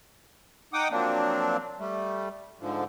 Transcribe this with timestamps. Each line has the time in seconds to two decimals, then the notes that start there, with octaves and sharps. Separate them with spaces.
0.73 D#4 F#5 G5 D6 D#6
0.91 F3 F#3 A#3 C4 D4
1.79 G3 A3
2.59 G#2 D3 F3